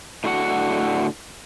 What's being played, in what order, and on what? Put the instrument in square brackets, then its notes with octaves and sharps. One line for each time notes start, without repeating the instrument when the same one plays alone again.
[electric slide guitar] A2 D3 F#4 F#5